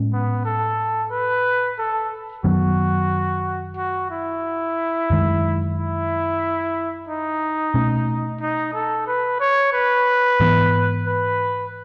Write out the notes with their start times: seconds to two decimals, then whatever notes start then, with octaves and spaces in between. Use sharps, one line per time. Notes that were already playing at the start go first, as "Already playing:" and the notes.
Already playing: A2 G#3 C#4
0.13 B3
0.45 A4
1.11 B4
1.78 A4
2.44 F#2 D#3 F#3 B3 F#4
3.77 F#4
4.11 E4
5.10 F#2 D#3 G#3
5.76 E4
7.09 D#4
7.74 B2 A3 C#4
8.41 D#4
8.74 A4
9.07 B4
9.40 C#5
9.73 B4
10.40 G#2 E3 B3
11.07 B4